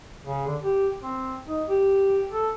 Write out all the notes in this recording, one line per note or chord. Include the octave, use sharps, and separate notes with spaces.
C#3
D3
G4
C4
D#4
G4
A4